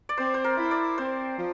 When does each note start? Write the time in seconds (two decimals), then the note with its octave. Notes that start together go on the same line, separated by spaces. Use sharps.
0.09 D5
0.17 C4 C5
0.34 C5
0.44 A#4
0.57 E4
0.71 D5
0.98 C4 C5
1.38 F3